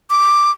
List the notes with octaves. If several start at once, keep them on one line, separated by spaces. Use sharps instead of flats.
D6